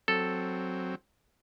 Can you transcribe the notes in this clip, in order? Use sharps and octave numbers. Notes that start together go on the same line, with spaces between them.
F#3 C4 A4